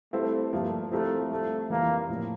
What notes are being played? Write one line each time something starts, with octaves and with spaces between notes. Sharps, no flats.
G3 A3 C4 E4 A4 C5
G2 F3 A3 A#3 F4
F3 A3 C4 E4 G4 A#4
G3 A3 C4 F4
F2 E3 G3 A#3 D4 F4
A2 F3 A#3